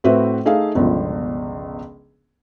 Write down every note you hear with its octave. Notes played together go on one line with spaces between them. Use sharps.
A2 C4 F#4 B4 E5
A3 D#4 G#4 E5 F5
G1 C#2 B2 F3